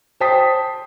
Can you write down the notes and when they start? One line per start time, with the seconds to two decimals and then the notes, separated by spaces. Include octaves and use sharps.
0.20 C5 G5 A5 D#6 B6